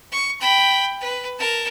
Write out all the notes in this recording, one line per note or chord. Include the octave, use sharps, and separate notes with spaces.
C#6
G5 B5
B4
A#4 A5